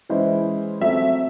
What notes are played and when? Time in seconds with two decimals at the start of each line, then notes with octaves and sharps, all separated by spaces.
0.09 E3 G#3 C#4 E4 C5
0.81 F#3 A3 C4 E5